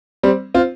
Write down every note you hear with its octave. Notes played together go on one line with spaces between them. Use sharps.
G3 C4
C4 F4